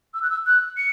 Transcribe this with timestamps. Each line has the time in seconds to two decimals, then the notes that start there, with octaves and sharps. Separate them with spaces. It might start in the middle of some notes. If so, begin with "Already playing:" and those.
0.14 E6
0.22 F#6
0.30 E6
0.46 F#6
0.77 C#7